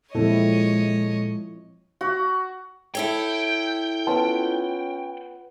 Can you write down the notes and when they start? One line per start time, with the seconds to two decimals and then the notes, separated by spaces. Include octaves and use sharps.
0.15 A#2 F3 G#3 C4 E4 A4 C#5 D#5
2.01 F#4
2.95 E4 A4 C#5 G5
4.07 B3 C#4 F4 A5